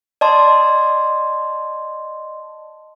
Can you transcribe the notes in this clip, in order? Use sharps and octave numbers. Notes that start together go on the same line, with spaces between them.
D5 D#5 A5 C6